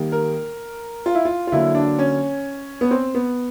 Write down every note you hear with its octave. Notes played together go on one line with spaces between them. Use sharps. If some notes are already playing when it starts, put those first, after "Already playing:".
Already playing: D#3 G3 A#3
A#4
F4
E4
F4
F4
D3 F#3 A#3 E4
D4
C#4
B3
C4
B3